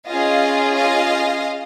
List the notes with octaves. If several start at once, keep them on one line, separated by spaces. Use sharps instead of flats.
C#4 F4 G#4 D#5 F5
D#5 F5